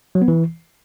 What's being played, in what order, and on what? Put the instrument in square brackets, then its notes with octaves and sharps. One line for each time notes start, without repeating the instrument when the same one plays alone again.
[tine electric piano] F#3
B3
E3